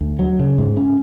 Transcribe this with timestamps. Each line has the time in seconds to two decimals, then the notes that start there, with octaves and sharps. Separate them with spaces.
0.01 D2
0.19 F#3
0.39 C#3
0.58 G#2
0.77 C#4